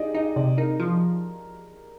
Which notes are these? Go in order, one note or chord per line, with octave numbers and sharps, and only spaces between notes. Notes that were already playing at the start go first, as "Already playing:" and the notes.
Already playing: D#4 G4 G#4 D5 D#5
D#4 D#5
C3 D5
D#4 A#4
F3